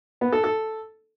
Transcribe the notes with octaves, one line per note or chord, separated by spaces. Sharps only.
B3
A4
A4